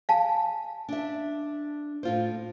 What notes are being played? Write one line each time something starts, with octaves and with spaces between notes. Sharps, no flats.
F5 G#5 A5
D4 E5
A2 F4 C5